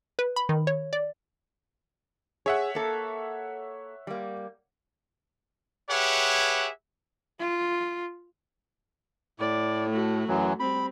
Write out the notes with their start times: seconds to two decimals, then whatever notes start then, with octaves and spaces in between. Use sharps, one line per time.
0.19 B4
0.36 B5
0.49 D#3
0.67 C#5
0.93 D5
2.46 G#4 C#5 E5 F#5
2.75 A#3 A4
4.07 G3 A#3
5.90 G4 G#4 B4 C#5 E5 F#5
7.39 F4
9.39 A2 D5
9.90 A3 F#4
10.28 F#2 E3 F#3
10.60 G3 C4 B5